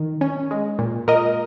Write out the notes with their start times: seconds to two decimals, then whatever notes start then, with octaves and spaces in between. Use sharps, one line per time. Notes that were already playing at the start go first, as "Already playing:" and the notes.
Already playing: D#3
0.21 C#4
0.51 G#3
0.79 A#2
1.08 A#2 A#4 D#5